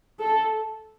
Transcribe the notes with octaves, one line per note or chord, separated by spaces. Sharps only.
A4